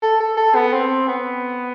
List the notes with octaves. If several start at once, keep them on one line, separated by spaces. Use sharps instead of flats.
A4
A4
A4
B3
C4
B3